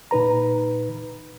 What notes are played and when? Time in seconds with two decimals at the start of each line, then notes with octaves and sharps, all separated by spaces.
0.11 A#2 D#4 B4 A#5